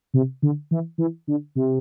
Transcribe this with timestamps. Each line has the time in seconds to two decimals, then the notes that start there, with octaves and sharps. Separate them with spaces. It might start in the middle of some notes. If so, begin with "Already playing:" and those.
0.14 C3
0.42 D3
0.71 E3
0.98 E3
1.27 D3
1.55 C3